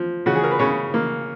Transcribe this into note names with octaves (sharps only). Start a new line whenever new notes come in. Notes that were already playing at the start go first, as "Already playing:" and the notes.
Already playing: F3
C#3 F#4
G#4
A#4
B4
C#3 C#5
A#3